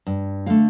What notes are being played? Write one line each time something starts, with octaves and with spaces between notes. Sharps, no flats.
G2
D3 A3 F5